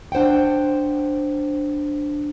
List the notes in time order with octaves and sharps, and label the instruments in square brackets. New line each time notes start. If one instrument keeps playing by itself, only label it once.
[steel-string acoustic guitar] D4 C5 F#5 G5